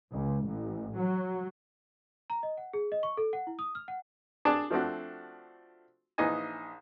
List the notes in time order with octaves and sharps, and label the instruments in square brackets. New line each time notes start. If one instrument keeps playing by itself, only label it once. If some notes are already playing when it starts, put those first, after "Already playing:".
[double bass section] C#2
A1
F#3
[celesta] A#5
D#5
F#5
G#4
D#5
C#6
A4
F#5
E4
D#6
F6
F#5
[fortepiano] D4 G#4 D5 A5
F3 A3 C4 D4 F#4
A#1 E3 D#4 D#5 G#5